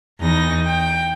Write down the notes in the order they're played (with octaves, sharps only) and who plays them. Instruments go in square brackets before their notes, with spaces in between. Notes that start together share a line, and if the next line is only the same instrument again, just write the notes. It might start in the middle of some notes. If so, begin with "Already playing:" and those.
[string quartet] E2 D#4 A#6
G5